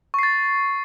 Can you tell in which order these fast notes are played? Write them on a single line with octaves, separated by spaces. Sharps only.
C#6 C7 A6